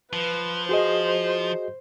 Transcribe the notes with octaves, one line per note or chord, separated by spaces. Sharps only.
F3 B4
F#4 G#4 C5 D#5